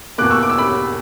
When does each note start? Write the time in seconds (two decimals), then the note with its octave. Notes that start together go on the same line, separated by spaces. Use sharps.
0.18 E2 B2 A#3 D6 F#6
0.30 C#6 E6
0.43 D6
0.50 E6
0.58 B5 D6